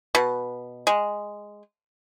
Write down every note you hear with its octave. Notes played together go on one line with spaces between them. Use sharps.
B2
G#3